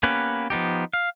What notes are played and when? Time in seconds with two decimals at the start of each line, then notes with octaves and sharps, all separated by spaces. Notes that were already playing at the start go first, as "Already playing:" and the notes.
0.03 A#3 B3 C#4 G4 B4
0.50 F3 B3 D#4 G4
0.93 F5